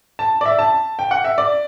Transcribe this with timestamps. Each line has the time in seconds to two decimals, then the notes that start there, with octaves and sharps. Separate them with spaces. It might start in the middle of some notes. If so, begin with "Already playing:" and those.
0.19 A5
0.41 D5
0.46 E5
0.59 A5
0.99 G5
1.11 F#5
1.24 E5
1.38 D5